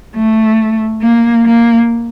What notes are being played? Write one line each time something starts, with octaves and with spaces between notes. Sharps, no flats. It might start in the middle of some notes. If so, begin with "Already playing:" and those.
A3
A#3
A#3